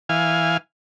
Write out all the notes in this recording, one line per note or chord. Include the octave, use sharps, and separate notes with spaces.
E3 F5 G#5